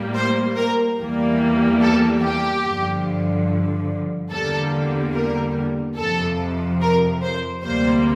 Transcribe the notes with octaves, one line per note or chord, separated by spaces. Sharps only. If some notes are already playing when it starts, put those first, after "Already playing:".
Already playing: A2 G3 A#3
C5
A#4
E2 E3 G3 A#3
A4
G4
G2 D3 F3
E2 D3 G3 A#3 A4
A#4
F2 C3 F3 A4
A#4
C5
D2 C3 G3 A#3 C5